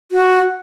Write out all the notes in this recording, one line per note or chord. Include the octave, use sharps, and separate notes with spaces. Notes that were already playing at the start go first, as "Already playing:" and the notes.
F#4